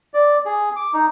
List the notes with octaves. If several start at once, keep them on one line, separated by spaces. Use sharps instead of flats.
D5
G#4
D6
D#4